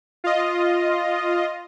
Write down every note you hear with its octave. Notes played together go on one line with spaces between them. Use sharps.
F4 D#5